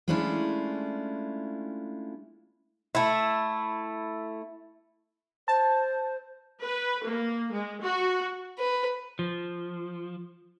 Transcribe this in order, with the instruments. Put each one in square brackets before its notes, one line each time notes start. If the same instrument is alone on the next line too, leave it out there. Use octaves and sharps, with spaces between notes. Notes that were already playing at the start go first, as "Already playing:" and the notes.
[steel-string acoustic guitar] G#3 A3 C#4 D4 E4 F4
[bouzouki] A3 E4
[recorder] C5 [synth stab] A5
[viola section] B4
A#3
G#3
F#4
[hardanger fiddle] B4
[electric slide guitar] F3